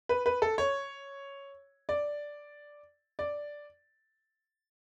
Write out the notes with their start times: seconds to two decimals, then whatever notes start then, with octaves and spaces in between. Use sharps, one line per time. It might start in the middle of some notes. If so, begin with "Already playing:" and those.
0.09 B4
0.26 B4
0.42 A4
0.58 C#5
1.89 D5
3.19 D5